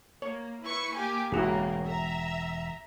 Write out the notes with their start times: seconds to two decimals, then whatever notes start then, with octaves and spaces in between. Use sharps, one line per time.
0.22 A#3 C#5
0.62 E4 B4 C#6
0.94 A#3 G4 G#5
1.32 E1 G#2 C#3 A#3 E4 F#4 G#4
1.86 E5 A#5